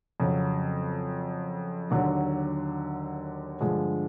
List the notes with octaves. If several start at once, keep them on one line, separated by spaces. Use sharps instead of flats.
F2 C#3 F#3
D#2 D3 F#3
G2 D3 F3 G#3